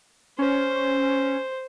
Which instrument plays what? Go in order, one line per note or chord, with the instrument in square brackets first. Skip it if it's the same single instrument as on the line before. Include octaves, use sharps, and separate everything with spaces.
[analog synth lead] C#4 [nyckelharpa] C5